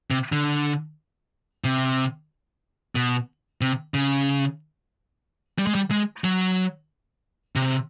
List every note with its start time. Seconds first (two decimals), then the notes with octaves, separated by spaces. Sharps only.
0.11 C3
0.32 D3
1.64 C3
2.95 B2
3.61 C3
3.94 C#3
5.59 G3
5.67 G#3
5.75 G3
5.91 G#3
6.24 F#3
7.56 C3